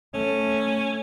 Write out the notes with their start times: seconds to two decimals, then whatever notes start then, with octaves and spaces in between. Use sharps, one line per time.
0.14 A3 C#4